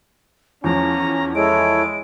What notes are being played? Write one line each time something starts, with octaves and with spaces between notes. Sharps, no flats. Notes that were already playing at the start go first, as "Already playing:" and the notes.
E2 F3 C#4 A#5
G#3 E4 A4 C#5 D7